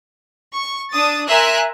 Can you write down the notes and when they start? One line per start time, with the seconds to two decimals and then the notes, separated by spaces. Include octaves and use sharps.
0.53 C#6
0.91 D4 D#6 A6
1.27 A#4 E5 G#5 A#5 C6 F#6